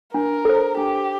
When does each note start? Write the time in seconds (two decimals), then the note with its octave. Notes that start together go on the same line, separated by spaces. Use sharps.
0.14 D4 A#4
0.45 A4 C5
0.77 D4 G4